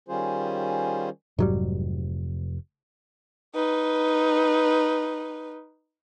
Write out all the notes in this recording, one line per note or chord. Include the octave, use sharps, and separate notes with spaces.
D#3 G3 C#4 F4 G#4 C5
F1 G#2 F#3 G3
D#4 B4